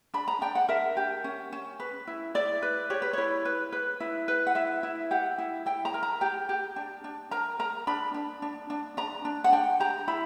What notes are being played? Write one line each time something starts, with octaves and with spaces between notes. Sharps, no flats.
D4 B5
A#5
D4 G5
F#5
A#4 E5
G4
C#4
C#4
B4
E4
E4 D5
B4
G4 C#5
B4
E4 C#5
B4
B4
E4
B4
F#5
E4 E5
E4
G4 F#5
E4
E4 G5
A#5
A#4
A#5
G4 G5
G4
D4
D4
A#4 A#5
A#4 A#5
D4 B5
D4
D4
D4
D4 A#5
D4
F#5
D4 G5
G4 A#5
E4 B5